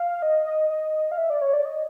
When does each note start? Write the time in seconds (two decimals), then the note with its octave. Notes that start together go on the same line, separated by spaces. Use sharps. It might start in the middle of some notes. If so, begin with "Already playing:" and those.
Already playing: F5
0.22 D#5
0.46 D#5
0.70 D#5
1.12 F5
1.18 E5
1.30 D5
1.41 C#5
1.53 D5
1.66 D#5